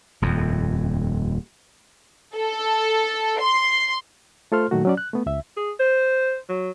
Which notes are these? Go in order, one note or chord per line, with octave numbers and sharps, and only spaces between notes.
D#1 F2
A4
C6
A3 F4 A4 C5 C6 F6
A#2 D#3 F#3 A3 F#4
F#3 C#4 D5
F#6
A3 B3
C#2 E5
G#4
C5
F#3